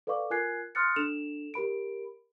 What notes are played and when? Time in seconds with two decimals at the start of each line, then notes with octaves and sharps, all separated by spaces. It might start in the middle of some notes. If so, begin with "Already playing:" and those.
0.07 A4 B4 D5 F5 C#6 D6
0.30 F4 A#4 G#5 F#6 G#6 C7
0.75 C6 D#6 F6 F#6 A6 C#7
0.96 D4 A4 E7 F7
1.54 G4 A#4 B5 D7